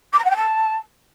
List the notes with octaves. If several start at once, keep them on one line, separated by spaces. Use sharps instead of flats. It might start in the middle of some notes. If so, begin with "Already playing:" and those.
D6
A#5
F#5
G5
A5